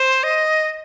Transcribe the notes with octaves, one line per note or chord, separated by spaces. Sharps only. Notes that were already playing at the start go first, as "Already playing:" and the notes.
Already playing: C5
D#5